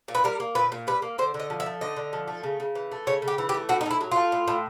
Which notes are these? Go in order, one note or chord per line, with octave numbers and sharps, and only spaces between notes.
A#2
B4
G3 A#4
A#3
A#2 B4
A#2
G3 B4
A#3
D3 C5
D3
D#5
F3
E5
A3
D3 D#5
D3
F3
A3
C#3
C#3
E3
A3
C#3 C#5
C#3
G4
E3
G4
A3
A2 F#4
D#4
A2 E4
F#3
A3 F4
A2
A2